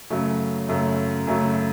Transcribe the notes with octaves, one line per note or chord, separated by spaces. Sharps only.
F#2 C#3 F#3 A3
F#2 C#3 F#3 A3
F#2 C#3 F#3 A3